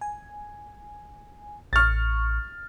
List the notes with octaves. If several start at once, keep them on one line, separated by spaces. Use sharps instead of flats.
G#5
A1 C#6 F6 A6